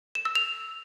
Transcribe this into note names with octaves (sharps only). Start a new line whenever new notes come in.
E7
E6
F7